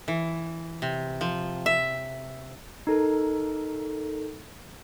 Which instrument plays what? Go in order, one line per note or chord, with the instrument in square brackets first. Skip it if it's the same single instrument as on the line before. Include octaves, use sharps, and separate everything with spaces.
[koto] E3
C3
F3
E5
[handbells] D#4 A4 A#4